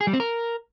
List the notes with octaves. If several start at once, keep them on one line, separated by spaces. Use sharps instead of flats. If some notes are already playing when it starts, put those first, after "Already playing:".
G#4
G3
C4
A#4